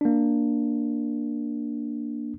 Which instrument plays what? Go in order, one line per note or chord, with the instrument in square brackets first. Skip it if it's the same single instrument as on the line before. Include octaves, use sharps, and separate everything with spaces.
[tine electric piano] A#3 D4